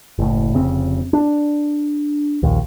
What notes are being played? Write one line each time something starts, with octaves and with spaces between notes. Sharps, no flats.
F#1 A2
F1 C#3 C4
D4
A#1 D#2